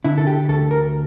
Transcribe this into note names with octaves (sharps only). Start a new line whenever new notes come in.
D3 E4
A4
G4
D2 A4
A#4